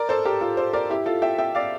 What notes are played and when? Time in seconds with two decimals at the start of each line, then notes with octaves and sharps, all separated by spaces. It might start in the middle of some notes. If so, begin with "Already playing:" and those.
Already playing: A#4 D5
0.09 A4 C5
0.25 G4 A#4
0.41 F4 A4
0.57 A4 C5
0.73 A#4 D5
0.90 E4 G4
1.06 F4 A4
1.22 E5 G5
1.39 E5 G5
1.55 D5 F5